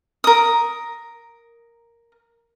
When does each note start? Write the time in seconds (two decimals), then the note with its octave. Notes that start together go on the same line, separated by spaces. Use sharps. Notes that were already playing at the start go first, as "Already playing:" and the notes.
0.24 A#4 D#6